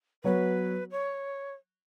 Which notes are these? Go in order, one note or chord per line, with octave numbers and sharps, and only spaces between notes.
F#3 B3 F#4 B4 C#5
C#5